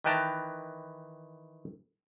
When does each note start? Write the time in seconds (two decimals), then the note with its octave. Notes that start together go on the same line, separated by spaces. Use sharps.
0.04 D#3 E3 B4 G5 A5 A#5